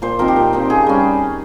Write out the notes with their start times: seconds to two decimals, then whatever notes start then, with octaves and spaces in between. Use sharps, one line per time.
0.02 A#2 C5
0.19 F3 C4 D#4 A#4
0.28 G4
0.36 A#2
0.53 F3 C4 D#4
0.70 C#3 G#4
0.87 G3 C#4